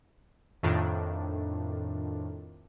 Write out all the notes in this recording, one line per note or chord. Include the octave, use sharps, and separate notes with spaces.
F2 A2 D#3 D4 F4